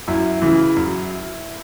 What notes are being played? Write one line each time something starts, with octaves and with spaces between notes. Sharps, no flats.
F#2 E4
C#3 E3
F#2